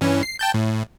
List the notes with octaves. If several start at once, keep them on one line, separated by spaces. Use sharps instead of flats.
G2 E3 C#4
C7
G5 A5 G6
A2